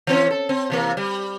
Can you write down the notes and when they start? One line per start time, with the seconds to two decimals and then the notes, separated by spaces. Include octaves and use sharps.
0.07 E3 C4 C#4
0.30 A4
0.49 C4
0.70 C3 E3 A#3
0.97 G3